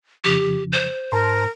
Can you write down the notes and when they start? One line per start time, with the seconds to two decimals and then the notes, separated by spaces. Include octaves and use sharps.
0.24 F2 C#3 F3 G4
0.72 C5
1.12 G#2 A#4 A5 A#5 C6